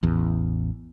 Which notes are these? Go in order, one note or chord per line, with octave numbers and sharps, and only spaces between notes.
A1 E2